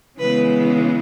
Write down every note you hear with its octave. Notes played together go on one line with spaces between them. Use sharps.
C#3 E3 G#3 B3 B4